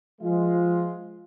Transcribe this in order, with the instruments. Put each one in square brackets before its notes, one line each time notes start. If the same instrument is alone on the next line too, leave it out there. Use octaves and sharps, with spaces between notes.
[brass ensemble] F3 G#3 F4